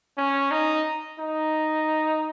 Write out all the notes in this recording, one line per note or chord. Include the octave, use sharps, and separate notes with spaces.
C#4
D#4
D#4